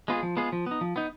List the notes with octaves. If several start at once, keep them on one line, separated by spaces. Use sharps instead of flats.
G#3 B3 F4 G#4
F3
G#3 B3 F4 G#4
F3
B3 D#4
F3
B3 D#4